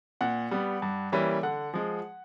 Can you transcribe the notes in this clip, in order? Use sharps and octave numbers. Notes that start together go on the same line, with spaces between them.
A#2 F#5
G3 B3
G2
E3 G3 A#3 C#4
D3 F#5
F3 G#3